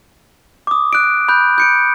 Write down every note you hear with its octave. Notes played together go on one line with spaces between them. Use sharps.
D6 D#6
F#6 D7
B5 F#6 G6
G6 C#7 D7